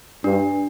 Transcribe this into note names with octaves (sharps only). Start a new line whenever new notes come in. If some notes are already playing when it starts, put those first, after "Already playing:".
G2 D4